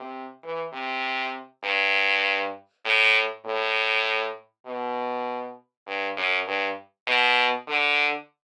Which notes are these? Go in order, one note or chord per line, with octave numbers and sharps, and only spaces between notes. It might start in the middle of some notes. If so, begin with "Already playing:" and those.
Already playing: C3
E3
C3
G2
A2
A2
B2
G2
F#2
G2
B2
D3